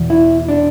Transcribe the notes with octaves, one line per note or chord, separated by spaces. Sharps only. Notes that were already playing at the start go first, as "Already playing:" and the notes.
Already playing: E2 B2
E4
D4